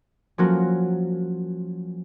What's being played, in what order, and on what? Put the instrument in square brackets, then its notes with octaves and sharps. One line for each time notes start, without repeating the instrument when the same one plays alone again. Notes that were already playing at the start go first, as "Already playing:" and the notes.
[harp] F3 F#3 A#3 C#4 F#4 A#4